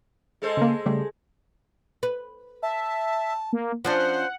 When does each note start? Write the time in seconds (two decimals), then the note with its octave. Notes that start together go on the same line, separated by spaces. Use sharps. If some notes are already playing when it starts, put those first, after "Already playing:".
0.42 G#3 A4 C5
0.57 C#3 A#3
0.86 C#3 G3 A3
2.03 B4
2.63 E5 A5
3.53 A#3
3.85 F3 C#4 D4 C5 F#5